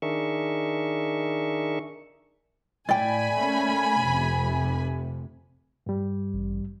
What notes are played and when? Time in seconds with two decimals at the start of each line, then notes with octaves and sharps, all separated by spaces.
0.02 D#3 D4 G#4 A#4 E5 C#6
2.89 A2 D5 G5 G#5 B5
3.34 A3 A#3 C#4
4.03 F1 C3
5.86 G2 G3
6.33 A1